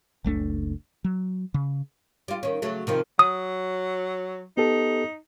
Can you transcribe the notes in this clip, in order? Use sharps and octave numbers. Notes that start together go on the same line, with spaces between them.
F#1 C#2 A3 D4
F#3
C#3
G3 F4
D#3 C#4
C#3 F#3 A3
C3 D#3 F3
F#3 D#6
B3 D#4 G4 A4